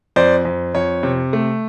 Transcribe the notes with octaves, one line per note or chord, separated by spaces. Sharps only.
F2 C5 D5
F2
F2 C#5
C3
A3